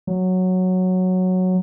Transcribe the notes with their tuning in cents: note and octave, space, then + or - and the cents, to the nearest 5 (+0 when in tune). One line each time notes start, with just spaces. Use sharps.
F#3 -5